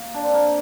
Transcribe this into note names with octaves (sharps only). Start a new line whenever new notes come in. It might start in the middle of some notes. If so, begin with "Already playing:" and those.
Already playing: A#3
D4
C4
A#3